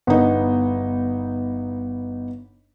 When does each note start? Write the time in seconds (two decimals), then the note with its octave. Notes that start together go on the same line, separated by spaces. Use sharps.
0.07 G1 B3 D#4